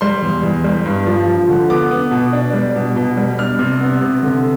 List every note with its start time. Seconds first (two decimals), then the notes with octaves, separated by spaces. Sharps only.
0.01 G3 C6
0.22 E2
0.43 E2
0.64 G3
0.86 G2
1.07 F3
1.28 F3
1.49 D3
1.70 B3 D6
1.91 B3
2.11 B2
2.33 D4
2.53 G3
2.76 B2
2.96 B2
3.17 G3
3.39 D4 F6
3.59 C3
3.81 B3
4.02 C3
4.23 D3